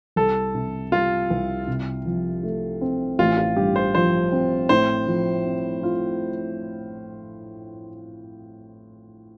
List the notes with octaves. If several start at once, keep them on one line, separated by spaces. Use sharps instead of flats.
C2 A4
C3
G3 F4
C2
C3
F3
A3
C4
A1 F4
F4
G2 G4
C5
F3 C5
C4
A2 C5
F3
C4
F4